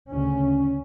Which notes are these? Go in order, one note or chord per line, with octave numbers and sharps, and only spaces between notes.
D2 C#3 C#4